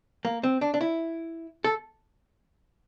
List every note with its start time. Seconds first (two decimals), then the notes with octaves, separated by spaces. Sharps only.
0.25 A#3
0.43 C4
0.61 D4
0.74 D4
0.81 E4
1.64 A4